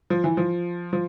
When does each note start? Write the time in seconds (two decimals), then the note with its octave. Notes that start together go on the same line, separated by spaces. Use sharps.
0.10 F3
0.24 E3
0.37 F3
0.93 F3